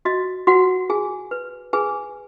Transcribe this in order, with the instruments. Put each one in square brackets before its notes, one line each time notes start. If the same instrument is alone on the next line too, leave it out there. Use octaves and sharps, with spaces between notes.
[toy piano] F#4 D#5
F#4 B4 F#5
F#4 G#4 G#5
B4
G#4 B4 G#5